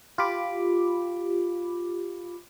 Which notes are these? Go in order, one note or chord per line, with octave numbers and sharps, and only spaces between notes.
F4 G4 B5 D6